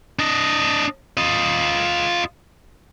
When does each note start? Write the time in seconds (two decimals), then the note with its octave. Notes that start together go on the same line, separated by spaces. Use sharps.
0.19 D4 D#5
1.17 F4 D#5